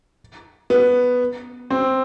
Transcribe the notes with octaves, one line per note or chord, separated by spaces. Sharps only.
B3
C4